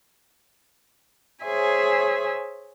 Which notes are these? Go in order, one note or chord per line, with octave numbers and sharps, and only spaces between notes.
G#4 C5 C#5 E5 G#5